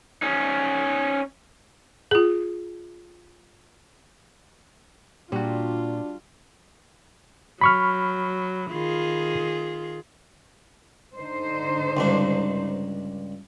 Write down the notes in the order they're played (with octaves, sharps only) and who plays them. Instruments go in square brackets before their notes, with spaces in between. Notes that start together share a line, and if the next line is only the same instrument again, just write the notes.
[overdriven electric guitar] C#4 D#4
[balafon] F4 G#4
[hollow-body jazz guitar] A#2 [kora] G3 F#4 [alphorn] D4 [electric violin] F4
[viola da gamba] F#3 [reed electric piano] B5 C#6 F6
[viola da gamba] D#3 F4 G#4
[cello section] D3 D#4 C5
[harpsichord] C#2 G2 D4